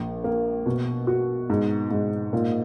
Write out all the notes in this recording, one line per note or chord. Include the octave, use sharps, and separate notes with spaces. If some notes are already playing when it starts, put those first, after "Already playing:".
Already playing: A#1
A#3
B2
F#4
G#2
G#2
A#2